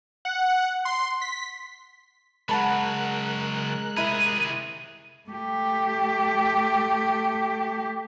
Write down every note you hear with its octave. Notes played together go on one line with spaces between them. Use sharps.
F#5
C6
B6
C#3 F#3 G#3 A#4 F#5 A5 B5 F#6
C3 E4 G#4 B5 D#7
A3 G4